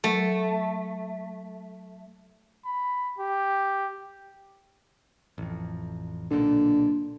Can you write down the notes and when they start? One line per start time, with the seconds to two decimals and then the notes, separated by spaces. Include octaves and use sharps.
0.04 F#3 A3
2.65 B5
3.18 G4
5.38 A1 F2
6.31 B1 A#2 D3